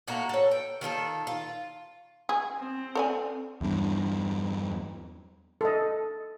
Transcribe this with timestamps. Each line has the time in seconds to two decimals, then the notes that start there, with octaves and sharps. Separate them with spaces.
0.08 A2 A#3 F#4 A#5
0.29 A4 C#5
0.51 G5
0.81 D#3 F4 G#4 A4
1.27 F4
2.29 G#4
2.59 C4
2.95 A4 D5 G#5
3.61 E2 G2
5.61 A4 D#5